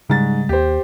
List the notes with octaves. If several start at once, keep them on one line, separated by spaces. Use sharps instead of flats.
G#2 C#3 G3 A6
D#2 G4 C5